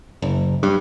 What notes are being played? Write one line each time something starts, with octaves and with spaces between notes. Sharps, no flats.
F#1
G2